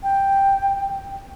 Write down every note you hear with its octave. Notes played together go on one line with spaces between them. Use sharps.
G5